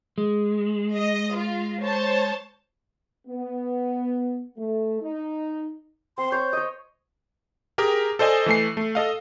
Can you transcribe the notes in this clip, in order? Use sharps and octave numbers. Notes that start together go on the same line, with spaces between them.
G#3
D#5
F4
C5 C#5 A5
B3
A3
D#4
C4 C6
C#5 C6 G6
C#5 D#5
G4 G#4 A#4
A4 C5 D5 D#5 G#5
E3 A3 C7
A3
A4 D#5 F5